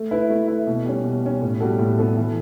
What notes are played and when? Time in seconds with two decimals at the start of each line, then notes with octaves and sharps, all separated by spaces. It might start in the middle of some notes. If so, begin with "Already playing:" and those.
Already playing: A3
0.11 E4 B4
0.30 A3
0.48 E4 B4
0.67 B2
0.85 G3 C#4
1.04 B2
1.23 G3 C#4
1.42 A2
1.60 G3 B3 F#4 A4
1.79 A2
1.98 G3 B3 F#4 A4
2.17 E3